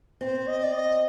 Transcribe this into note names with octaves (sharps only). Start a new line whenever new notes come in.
C4 C5
D#5
D5
D#5